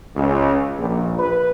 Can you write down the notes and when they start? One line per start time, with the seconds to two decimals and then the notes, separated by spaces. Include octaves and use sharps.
0.15 C#2
0.78 A#1
1.19 B4